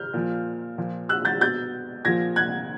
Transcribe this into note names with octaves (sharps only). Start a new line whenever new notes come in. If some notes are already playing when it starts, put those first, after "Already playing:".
Already playing: F6 G6
A#2 F3
A#2 F3
E6 F#6
G6 A6
B2 G6 A6
A#2 F3 G#6 A#6
F#6 G#6